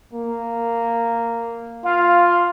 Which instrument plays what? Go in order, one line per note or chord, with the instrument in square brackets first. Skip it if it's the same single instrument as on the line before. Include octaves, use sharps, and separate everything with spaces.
[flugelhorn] A#3
[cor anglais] F4 [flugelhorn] F5